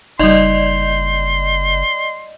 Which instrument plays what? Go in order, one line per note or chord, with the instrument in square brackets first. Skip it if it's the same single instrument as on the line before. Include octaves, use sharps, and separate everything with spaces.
[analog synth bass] F#1 [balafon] G3 D#4 [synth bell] D5 D#5 G6 [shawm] C6